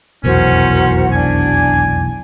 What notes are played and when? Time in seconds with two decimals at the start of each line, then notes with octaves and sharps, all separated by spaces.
0.24 F1 B1 E2 C#4 F#4 A#4 C5
1.12 D4 G#5